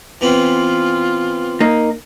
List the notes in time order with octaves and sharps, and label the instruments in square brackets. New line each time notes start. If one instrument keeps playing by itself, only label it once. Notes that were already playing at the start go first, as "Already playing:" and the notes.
[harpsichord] E3 B3 C4 [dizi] F4
[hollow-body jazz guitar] A#3 D#4